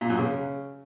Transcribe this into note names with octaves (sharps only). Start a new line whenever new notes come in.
A#2
F#2
C#3